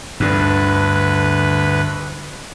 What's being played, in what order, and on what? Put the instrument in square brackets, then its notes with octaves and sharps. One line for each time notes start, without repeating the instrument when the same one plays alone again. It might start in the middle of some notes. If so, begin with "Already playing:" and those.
[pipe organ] D2 B4 [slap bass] G2 D3